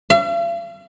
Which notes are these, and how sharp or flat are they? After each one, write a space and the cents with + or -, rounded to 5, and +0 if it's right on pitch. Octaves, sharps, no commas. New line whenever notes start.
F5 -45